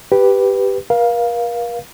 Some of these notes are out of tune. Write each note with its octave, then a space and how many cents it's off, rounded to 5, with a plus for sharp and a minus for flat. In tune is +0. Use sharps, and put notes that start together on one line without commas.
G4 +0 B4 +0
A#4 +40 F5 +0